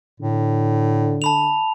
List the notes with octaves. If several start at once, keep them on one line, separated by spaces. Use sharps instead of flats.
A2 D3
A5 B5 F7